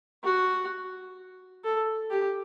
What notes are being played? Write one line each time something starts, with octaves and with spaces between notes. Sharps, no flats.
F#4
A4
G4